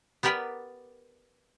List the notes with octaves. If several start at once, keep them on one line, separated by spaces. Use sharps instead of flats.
B3 G4 A#4 B4 D5 G5